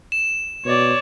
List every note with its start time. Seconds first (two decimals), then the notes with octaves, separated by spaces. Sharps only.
0.12 E7
0.65 B2 C#5 D5